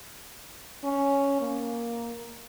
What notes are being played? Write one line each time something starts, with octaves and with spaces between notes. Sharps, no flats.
C#4
A#3